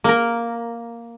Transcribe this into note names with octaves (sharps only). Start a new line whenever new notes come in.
A#3 A#4